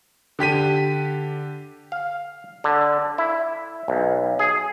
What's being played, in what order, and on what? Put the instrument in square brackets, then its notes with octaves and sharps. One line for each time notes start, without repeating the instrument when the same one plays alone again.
[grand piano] D3 G4 B6 D#7
[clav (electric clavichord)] F5
D3
E4
B1
G#4